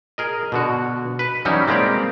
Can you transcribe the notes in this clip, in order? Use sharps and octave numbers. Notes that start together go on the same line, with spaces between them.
G#4 A#4 D#5
B2 D3 F#4
B4
E3 F#3 G3 C#4 D#4 E4
G3 G#3 A#3 C4 G4 D5